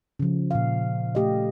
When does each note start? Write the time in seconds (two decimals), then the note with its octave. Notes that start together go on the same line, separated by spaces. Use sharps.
0.19 C#3 F3
0.51 A#2 F5
1.15 A3 G4 D#5